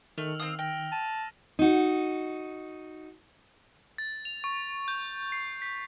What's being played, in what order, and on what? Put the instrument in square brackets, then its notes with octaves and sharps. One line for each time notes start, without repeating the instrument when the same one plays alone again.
[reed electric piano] D#3 [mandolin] A3 [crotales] E6 F6 F7
[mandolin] C4 F5 D#6
[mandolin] G5 [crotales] F6 A#6
[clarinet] A5 [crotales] D#7 F7
[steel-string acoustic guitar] D#4 F#4
[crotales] A6
F7
C#6
G6
C7
B6